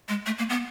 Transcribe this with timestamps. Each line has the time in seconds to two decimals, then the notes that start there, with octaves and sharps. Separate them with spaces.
0.09 G#3
0.26 A3
0.38 A#3
0.50 B3